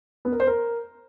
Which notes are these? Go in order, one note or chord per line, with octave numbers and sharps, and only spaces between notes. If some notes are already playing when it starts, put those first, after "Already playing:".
B3
A#4
C5
A#4